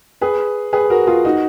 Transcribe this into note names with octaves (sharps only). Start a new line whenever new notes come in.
G#4 B4
G#4 B4
F#4 A#4
F4 G#4
D#4 F#4